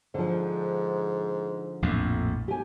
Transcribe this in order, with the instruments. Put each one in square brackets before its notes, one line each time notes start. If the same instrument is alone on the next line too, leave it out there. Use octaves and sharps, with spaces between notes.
[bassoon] G#2 [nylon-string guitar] D3 F3
[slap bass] A#1 F2 A2
[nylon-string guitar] G4 G#5